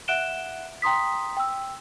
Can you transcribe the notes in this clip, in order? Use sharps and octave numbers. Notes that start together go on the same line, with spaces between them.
E5 F#5 F#6 D7 E7 G7
G5 A#5 C6 D#6 B6
G5 E6